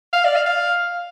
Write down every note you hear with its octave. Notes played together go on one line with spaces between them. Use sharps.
F5
D5
F5
F5